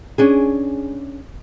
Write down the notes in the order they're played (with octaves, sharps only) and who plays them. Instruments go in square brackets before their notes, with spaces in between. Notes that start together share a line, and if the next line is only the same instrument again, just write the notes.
[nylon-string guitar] C#4 D4 G#4